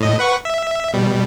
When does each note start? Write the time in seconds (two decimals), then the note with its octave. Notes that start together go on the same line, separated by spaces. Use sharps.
0.01 A2 D#5
0.19 B4 F#5 C#6
0.45 E5
0.93 B2 G3